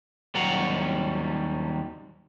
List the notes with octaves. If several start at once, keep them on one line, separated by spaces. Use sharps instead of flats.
D#2 F#3 G3 F5 F#5 A#5